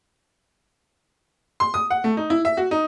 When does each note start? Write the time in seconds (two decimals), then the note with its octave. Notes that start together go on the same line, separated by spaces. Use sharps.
1.60 C6
1.74 D#6
1.90 F#5
2.04 A3
2.17 D#4
2.30 E4
2.45 E5
2.57 F#4
2.71 D#4